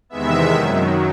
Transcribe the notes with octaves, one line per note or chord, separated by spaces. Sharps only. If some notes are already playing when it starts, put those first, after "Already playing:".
E2 C3 D#3 G#3 B3 E5
F#2 D#3 F#3